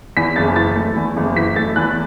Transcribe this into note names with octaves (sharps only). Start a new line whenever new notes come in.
E2 B6
F#1 A6
E3 A6
A3
E2
F#1
E3 B6
A3 A6
E2 F#6